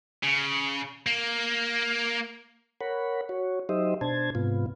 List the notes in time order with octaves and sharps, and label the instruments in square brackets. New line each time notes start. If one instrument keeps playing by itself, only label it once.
[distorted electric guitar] C#3
A#3
[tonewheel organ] A#4 C#5 F#5 B5
F#4 C#5
F#3 D#4 G4 C5 D#5 E5
B2 D4 C5 A5 G#6
G#2 C3 B3 F4